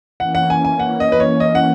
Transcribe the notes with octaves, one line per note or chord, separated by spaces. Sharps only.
E3 A#3 C#4 F#5
F#5
G#5
G#5
F#5
D#5
B4
C#5
D#5
F#5